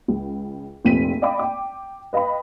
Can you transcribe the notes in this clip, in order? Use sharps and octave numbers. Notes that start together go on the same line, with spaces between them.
C#2
F1 A#1 F3 C4 B6 D#7
D5 D#5 F5 G5 B5 D6
G5 D6
B4 D#5 F5 G5 B5